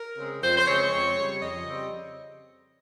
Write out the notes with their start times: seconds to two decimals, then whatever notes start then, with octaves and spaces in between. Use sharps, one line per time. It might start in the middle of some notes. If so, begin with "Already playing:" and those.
Already playing: A#4
0.18 C#3 G#3 C4
0.42 F2 C5
0.57 C5
0.66 C#3 G#3 C4 C#5
0.92 F2
1.16 C#3 G3 C4
1.41 F2 D#5
1.66 C#3 G3 C4